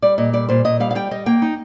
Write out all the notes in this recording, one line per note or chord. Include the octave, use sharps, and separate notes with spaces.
G3 D5
A#2 D#5
G3 D5
A#2 C5
A#2 D#5
G3 F5
F5
G3 G5
G3 D#5
A#3 G5
D#4